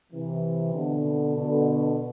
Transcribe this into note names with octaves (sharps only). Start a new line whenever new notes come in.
C3 E3
B2 D3
B2 D3